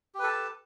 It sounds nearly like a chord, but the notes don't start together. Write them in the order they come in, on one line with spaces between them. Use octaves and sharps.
G4 B4 A4 A5